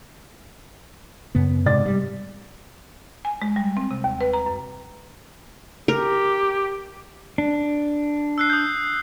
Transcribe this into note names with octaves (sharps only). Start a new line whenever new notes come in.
F#2 C#3 B3
G#2 C3 D5 A6
G3
G#5
G#3
G3
C4
C3
D#2
B4
A#5
F#2
G4 A#4
D4
E6 F#6 C7
D#6 G6